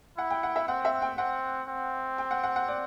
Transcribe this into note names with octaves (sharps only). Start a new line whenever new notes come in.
E4 F#5
G5
F#5
E5
C4 F#5
E5
G5
C4 F#5
C4
G5
F#5
F#5
F#5
D5